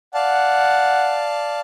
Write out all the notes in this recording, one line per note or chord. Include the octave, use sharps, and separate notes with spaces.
D5 F5 F#5 A5